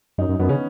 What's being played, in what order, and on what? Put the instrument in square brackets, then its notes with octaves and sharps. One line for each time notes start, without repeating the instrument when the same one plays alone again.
[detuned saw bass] F#2 [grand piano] D#4
[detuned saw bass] F#2
[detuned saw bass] F#2 [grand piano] B3
[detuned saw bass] C#3 [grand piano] C#4